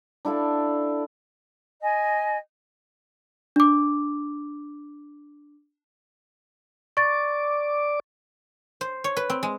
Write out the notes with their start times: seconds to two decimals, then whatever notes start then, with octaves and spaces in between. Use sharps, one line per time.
0.25 D4 E4 A4 F5
1.80 D#5 G#5
3.56 D4 D6
6.97 D5 C#6 D6 A6
8.81 C5
9.04 C#5
9.17 B4
9.30 C4
9.43 G#3